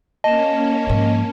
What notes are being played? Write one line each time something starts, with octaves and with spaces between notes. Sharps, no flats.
A#3 C#4 D#5 A5 E7
G#2 F3